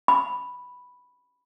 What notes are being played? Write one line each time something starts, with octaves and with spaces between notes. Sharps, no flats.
B5